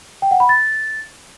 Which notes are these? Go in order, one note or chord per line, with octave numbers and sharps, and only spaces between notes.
G5
F#5
B5
A6